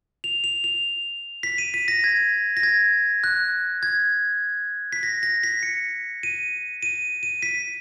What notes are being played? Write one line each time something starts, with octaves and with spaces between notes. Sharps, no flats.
F7
F7
F7
B6
D#7
B6
A#6
G#6
A#6
G#6
F#6
G#6
B6
A#6
A#6
B6
C#7
D#7
D#7
D#7
B6